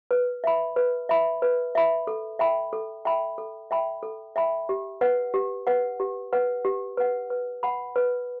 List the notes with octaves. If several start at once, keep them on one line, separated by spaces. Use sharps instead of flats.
B4
E5 B5
B4
E5 B5
B4
E5 B5
A4
E5 G5 B5
A4
E5 G5 B5
A4
E5 G5 B5
A4
E5 G5 B5
G4
B4 F#5
G4
B4 F#5
G4
B4 F#5
G4
B4 F#5
B4
F#5 B5
B4